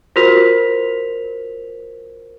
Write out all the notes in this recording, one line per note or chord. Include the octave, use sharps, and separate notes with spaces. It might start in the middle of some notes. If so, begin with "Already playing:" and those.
F4 F#4 A#4 C5 B6 F7